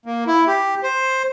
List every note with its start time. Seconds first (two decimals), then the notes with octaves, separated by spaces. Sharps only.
0.06 A#3
0.27 E4
0.47 G4
0.83 C5